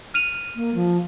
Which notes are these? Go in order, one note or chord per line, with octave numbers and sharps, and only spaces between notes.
F6 D#7 F7
A#3
F3